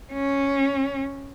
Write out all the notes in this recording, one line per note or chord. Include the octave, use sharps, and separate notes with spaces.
C#4